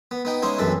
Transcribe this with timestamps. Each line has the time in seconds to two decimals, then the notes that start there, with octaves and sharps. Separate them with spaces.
0.11 B3
0.25 B3 D#4 G5
0.42 G#3 C#4 D#4 E4 C5
0.58 A#1 F#2 E3 C4 A4